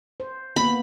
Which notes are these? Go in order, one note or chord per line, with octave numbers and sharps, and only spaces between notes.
C5
A#3 B3 B5